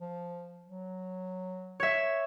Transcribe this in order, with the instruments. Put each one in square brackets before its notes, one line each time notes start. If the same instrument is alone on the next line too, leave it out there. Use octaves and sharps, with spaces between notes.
[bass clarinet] F3
F#3
[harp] C#5 E5